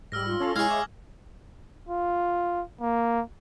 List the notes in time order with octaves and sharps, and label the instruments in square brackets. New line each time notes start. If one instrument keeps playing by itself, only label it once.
[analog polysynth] G#2 G3 [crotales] E6 F6 A#6
[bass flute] F4
[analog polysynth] C#4 A4 F5
[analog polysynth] G#3 C#5 [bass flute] E4 [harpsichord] G#4 F5 [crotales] G#6
[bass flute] E5 [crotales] D6
[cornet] F4
A#3